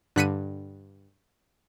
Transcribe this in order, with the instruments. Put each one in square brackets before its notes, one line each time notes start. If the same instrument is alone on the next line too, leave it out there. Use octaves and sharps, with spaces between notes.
[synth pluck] G2 D3 F#6 B6 C#7 D#7